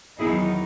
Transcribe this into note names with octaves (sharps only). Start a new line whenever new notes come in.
E2 D#3 F#3 B3 D#4 E4 G#4